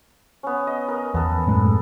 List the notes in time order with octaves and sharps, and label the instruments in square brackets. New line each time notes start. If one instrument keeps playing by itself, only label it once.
[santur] B3 C#4
D#5
A#4
[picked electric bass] E2 [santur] B3 A4 B5
[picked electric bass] F#2 A2 G#3